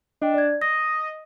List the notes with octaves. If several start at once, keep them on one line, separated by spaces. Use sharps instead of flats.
D4 D#5 G5
D5 G#6
D#5 A#6